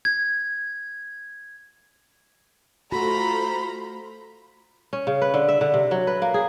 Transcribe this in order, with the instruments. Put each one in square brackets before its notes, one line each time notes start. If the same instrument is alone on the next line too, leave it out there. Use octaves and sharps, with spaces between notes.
[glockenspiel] G#6
[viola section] A3 F4 C5 [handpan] F#4 [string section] A#5 [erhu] B5
[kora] C#4
C#3
B4
D3
E5
D3
C3
F#3
B4
A#3
G#4